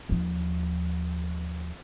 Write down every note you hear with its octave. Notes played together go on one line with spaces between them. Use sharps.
D#2 F3